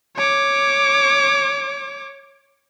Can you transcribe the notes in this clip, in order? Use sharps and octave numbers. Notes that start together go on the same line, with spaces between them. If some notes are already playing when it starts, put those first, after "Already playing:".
C#5 D6